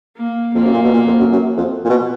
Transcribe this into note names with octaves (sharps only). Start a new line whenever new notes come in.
A#3
F2 A#3
F#2
A#2
B2
A#2
F2
F#2
F#2
F2
A#2
B2